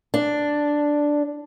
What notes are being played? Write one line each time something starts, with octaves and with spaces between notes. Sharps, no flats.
D4